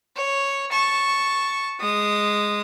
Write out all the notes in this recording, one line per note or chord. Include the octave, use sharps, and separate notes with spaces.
C#5
A5 C#6
G#3 D#6